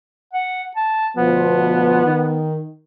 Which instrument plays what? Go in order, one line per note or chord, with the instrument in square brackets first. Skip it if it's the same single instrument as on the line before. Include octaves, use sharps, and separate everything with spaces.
[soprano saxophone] F#5
A5
[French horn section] D2 B2 F3 [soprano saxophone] B3
[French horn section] D#3